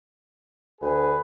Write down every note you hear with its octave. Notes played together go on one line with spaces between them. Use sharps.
D2 G#4 B4